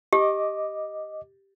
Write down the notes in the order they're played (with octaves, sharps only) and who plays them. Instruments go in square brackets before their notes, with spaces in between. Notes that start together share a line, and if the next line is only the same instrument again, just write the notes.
[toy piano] G4 [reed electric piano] D#5 D6